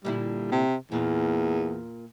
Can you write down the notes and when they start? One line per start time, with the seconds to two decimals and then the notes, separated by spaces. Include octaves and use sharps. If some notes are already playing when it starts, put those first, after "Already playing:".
0.05 A#2 D3 G3 E4
0.52 C3
0.92 E2 A#2